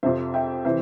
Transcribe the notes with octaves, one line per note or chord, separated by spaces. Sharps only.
F2 C3 F3 C5 E5
E5 G5
C3 E3 C5 E5